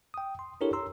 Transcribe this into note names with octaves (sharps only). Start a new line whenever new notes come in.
G5 D#6
C6
D4 E4 G4 A4 A#4 C#5
A#5 C6 E6